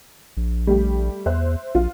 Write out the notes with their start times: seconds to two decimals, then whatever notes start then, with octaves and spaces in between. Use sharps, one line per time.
0.37 A#1
0.67 G3 A3 G4
1.26 E2 C5 E5 F#6
1.75 A#1 F4